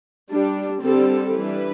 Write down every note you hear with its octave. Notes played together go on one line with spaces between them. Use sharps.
G3 D4
D3 G3 C4 A4
E3 G3 D4 B4